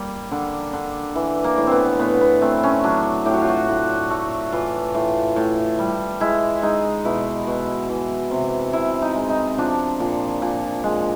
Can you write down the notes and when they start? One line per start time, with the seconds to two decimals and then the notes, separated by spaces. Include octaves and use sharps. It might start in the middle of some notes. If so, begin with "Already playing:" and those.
Already playing: G3 A#3
0.31 D3
0.73 D3
1.15 E3
1.44 A#3
1.57 A2
1.67 B3 C4
1.99 A2 B3
2.21 B3
2.42 A3 C4
2.63 C#4
2.84 F#3 D4
3.25 A2 G4
3.34 F#4
3.42 F4
3.49 F#4
3.68 A2
4.10 A3
4.52 E3 F4
4.95 A2
5.36 A2
5.79 G3
6.20 G#3 E4
6.62 G#3 D#4
7.05 B2 E4
7.47 B2
7.89 E3
8.31 C3
8.73 C3 E4
9.02 D#4
9.15 G#3
9.29 D#4
9.58 F3 D4
10.00 A#2
10.42 A#2
10.84 G#3